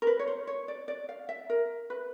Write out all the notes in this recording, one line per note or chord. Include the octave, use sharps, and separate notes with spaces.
A#4
B4
C#5
C5
C#5
D5
D5
F5
E5
A#4
B4